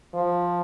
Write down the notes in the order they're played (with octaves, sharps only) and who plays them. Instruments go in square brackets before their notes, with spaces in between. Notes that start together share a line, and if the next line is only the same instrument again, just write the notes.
[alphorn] F3